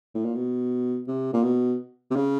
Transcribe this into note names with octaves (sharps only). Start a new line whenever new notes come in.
A2
A#2
B2
C3
A#2
B2
C3
C#3